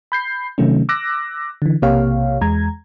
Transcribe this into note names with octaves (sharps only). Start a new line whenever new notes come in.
B5 G6 C7
C3 D#3 F#3 A3 C#4
D6 E6 F#6 A#6
D3 E3
B1 C3 A#3 G4 C#5 F5
E2 G#3 A#5 G#6